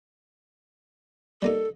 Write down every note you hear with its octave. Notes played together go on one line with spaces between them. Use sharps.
G3 A#3 D#4 A4